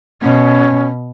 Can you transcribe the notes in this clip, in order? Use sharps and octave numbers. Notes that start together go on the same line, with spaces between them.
B2 C#4